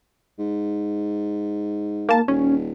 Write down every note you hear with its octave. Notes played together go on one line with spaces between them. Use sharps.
G#2
A#3 A5
D#1 C#4